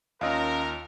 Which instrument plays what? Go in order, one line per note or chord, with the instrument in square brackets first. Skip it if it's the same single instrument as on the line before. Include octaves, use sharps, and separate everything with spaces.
[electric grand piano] D#2 F4 E6 [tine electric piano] C#4 D#5 F5 [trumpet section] A#4